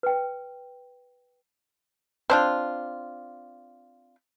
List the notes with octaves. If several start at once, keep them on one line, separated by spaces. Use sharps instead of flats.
B4 G5
C4 D4 F4